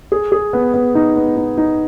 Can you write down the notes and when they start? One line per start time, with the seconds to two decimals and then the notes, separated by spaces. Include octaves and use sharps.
0.12 G#4
0.32 G#4
0.53 B3
0.74 B3
0.95 D#4
1.16 B3
1.37 D#4
1.57 D#4